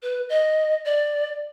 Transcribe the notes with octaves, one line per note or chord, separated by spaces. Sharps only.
B4
D#5
D5